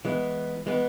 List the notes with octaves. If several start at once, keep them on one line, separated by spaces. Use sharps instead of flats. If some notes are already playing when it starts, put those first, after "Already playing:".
E3 G#3 B3
E3 G#3 B3